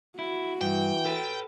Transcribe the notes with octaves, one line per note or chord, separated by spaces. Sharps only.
E4 F#4
G2 E3 G5
A4 B4